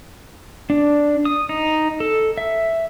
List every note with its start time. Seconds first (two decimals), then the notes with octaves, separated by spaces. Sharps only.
0.70 D4
1.25 D#6
1.49 D#4
2.00 A4
2.38 E5